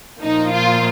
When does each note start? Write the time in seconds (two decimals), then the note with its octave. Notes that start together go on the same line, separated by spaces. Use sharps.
0.22 A#2 F3 A#3 D#4
0.53 F4